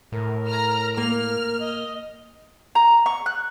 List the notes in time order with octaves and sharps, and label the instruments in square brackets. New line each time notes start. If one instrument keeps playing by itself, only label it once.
[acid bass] A2 [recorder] A#4
[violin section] A#5 F6
[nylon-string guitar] A#3 [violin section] F6
[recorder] D#5
[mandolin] A#5
C#6
F#6